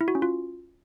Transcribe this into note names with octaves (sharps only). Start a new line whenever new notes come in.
E4
F#4
C#4
F4